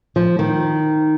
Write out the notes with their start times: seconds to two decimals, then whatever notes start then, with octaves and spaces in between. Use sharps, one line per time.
0.16 F3
0.39 D#3